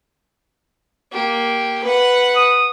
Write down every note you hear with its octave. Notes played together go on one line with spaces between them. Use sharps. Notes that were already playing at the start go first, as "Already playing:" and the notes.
A#3 G4
B4 F#5
D#6